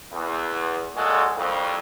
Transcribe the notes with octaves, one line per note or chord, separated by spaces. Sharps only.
E2
A#2 F#3 G#3 F#4 A4
C2 F2